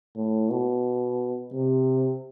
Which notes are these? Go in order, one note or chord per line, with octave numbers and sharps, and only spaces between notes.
A2
B2
C3